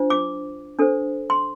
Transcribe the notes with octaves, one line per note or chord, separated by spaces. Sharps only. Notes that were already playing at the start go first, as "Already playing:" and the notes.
Already playing: D4 F4 C5
D6
D4 A4 C5
C6